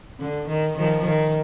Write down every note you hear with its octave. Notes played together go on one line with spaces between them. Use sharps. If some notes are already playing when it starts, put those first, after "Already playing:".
D3
D#3
D#3 F3
D#3